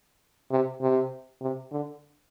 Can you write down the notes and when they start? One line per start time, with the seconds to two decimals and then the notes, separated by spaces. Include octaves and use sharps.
0.52 C3
0.81 C3
1.41 C3
1.71 D3